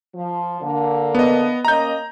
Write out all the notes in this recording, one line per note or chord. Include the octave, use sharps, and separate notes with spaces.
F3
D3 A#3
B3 D#5
A#3 C#4 D#5 A#5 G6